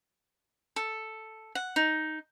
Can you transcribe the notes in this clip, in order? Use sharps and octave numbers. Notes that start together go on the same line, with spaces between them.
A4
F#5
D#4